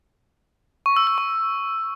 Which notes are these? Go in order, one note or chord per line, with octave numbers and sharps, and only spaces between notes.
C#6
E6
E6
C#6